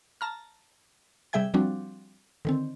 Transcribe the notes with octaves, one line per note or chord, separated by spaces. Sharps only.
A5 A#5 F6
C3 G3 G#4 E5 G5 G#6
F3 G3 C4 D4 F#4
D3 D#3 C4